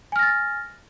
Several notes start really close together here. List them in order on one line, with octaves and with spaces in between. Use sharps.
G#5 F6 A#6 A6